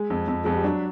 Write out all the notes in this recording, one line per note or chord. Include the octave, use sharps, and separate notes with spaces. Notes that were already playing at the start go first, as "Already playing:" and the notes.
Already playing: G#3
F2
F2
F2 G#3
G3
F#3 D4